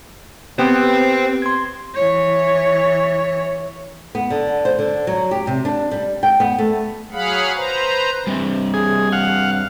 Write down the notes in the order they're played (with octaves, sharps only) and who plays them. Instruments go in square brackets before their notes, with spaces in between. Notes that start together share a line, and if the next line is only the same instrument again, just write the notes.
[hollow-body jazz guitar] B3 [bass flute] C4 [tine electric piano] G4 [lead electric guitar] C5 G5
[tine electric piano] C6 G#6
[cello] E3 C#5
[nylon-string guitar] B3
D3
C5
D3
F#3
G4
C3
D4
G3
G5
B3
A3
[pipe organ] F#3 G#4 F5 F#5 B5
B4 C5 A#5
[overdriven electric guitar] G2 C4
[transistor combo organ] G#4
F5 F#5